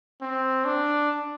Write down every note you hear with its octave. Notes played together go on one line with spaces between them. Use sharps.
C4
D4